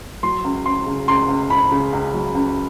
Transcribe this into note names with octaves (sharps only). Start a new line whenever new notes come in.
F#3 C6
C#2
C#2 C6
C#3
C#2 C6
C#2
C#2 B5
C#3
C#2
F#3
C#2